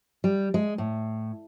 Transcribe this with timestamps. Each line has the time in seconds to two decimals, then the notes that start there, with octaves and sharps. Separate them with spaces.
0.24 G3
0.54 G#3
0.78 A2